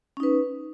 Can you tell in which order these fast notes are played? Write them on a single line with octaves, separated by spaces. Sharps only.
C#4 D#4 B4